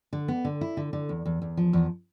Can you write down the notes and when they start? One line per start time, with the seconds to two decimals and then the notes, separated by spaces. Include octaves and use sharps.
0.13 D3
0.28 B3
0.45 D3
0.61 E4
0.77 D3
0.93 D3
1.09 E2
1.25 E2
1.42 E2
1.57 F3
1.73 E2